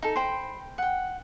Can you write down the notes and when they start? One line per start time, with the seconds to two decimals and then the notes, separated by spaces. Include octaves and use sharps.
0.02 D#4 A4
0.16 C5 G5 B5
0.78 F#5 G5